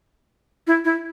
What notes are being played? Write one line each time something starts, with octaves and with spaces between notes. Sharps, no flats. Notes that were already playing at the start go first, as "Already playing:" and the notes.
E4
E4